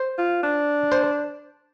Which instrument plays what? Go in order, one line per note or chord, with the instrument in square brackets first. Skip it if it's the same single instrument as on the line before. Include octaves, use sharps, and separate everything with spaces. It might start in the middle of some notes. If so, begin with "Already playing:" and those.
Already playing: [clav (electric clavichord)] C5
[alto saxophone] F4
D4
[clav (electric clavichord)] C5